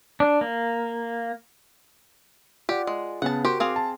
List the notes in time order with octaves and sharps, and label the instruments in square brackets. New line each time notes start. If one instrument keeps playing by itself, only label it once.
[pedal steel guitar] D4
A#3
[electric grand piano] F4 D5 F#5 [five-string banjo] G4
[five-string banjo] G#3
[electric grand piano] C#3 B3 [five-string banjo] F#5 A5
[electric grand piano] F#4 A#4 D6 [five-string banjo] G4 C5
[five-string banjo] C4 G#4 F5
[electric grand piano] A5